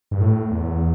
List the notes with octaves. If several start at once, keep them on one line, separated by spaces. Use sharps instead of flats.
G2
A2
E2